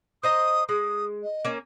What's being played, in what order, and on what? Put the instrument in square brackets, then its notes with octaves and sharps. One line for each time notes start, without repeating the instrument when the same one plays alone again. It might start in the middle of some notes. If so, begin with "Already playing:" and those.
[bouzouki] C5 D#5 A#5 [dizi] D#6
[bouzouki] G#3 [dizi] D#6
[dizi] D#5
[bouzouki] A#3 C#4